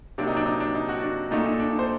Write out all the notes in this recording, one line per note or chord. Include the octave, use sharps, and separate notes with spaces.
C3 F#3 A#3 D4
D#4
D4
D#4
D4
D#4
F#4
D4
A#2 A3 D4 D#4
D#4
D4
D#4
C5